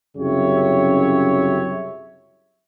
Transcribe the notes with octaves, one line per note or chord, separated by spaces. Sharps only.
C2 F#2 C#3 G4 C#5 E5